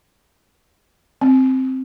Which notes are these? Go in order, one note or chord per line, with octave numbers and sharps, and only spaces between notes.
C4